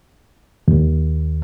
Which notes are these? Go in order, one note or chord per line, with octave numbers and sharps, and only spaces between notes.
D#2